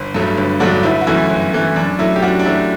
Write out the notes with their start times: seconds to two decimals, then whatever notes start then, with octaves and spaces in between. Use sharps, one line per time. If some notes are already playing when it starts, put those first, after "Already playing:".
Already playing: G1
0.14 G2 D3 F#3 A3
0.38 G1
0.60 G2 D3 F#3 A3 D4 F#4
0.83 G1 E4
1.01 F#4
1.07 F#2 E3 A3 E4
1.30 G1
1.53 F#2 E3 A3
1.76 F#2 D4
1.99 F#3 A3 E4
2.16 G4
2.22 F#2 D4 F#4
2.39 D4
2.45 F#3 A3 E4